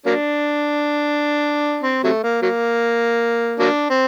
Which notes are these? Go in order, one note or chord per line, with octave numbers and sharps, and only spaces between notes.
F#3 A#3 D4
C4
C3 F#3 A3
A#3
F#3 A#3
F#3 A#3 D4
C4